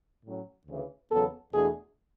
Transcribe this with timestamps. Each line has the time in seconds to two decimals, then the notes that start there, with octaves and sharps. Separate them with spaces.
0.24 A2 F#3 C#4
0.67 D2 C#3 E3
1.10 E2 C#3 F#3 B3 A4
1.53 E2 B2 A3 D4 G#4